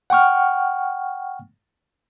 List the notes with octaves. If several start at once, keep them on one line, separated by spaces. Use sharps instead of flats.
F#5 G5 C#6 F6